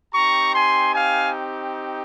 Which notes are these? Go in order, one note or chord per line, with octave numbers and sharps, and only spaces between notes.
C4 D#4 G4 A#5 C#6
G#5 C6
F5 G#5